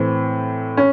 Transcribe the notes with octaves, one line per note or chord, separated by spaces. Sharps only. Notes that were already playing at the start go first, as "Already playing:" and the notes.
Already playing: A2 E3 C4
C#4